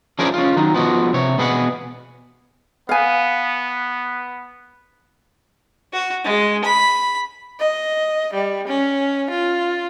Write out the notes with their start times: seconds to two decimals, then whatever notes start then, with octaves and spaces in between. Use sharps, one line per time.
0.19 F3 C#4 G#4 A#4 C5 D5
0.34 C#4 F4
0.56 D#3 F#3 D#4
0.74 F3 B3 F#4
1.13 C3 C#5
1.38 B2 B3 G#4 B4 F#5
2.89 B3 F5 G#5
5.93 F#4
6.24 G#3
6.65 B5
7.60 D#5
8.34 G3
8.68 C#4
9.30 F4